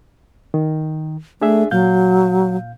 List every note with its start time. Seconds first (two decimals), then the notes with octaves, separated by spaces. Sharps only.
0.54 D#3
1.41 A3 D4 G#4 E5
1.71 A#2 F#3 F5 G6